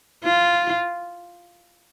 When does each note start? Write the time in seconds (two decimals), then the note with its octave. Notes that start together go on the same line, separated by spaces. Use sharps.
0.24 F4